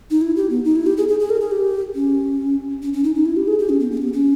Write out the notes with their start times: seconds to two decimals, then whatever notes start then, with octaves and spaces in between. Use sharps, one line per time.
0.11 D#4
0.21 E4
0.36 G4
0.50 B3
0.65 D#4
0.76 E4
0.87 G4
0.97 G#4
1.08 G#4
1.20 G#4
1.30 A#4
1.41 G#4
1.51 G4
1.95 C#4
2.82 C#4
2.93 C#4
3.04 D#4
3.15 D#4
3.26 E4
3.37 G4
3.48 G#4
3.59 G4
3.69 C#4
3.80 B3
3.91 A#3
3.97 C#4
4.02 B3
4.13 C#4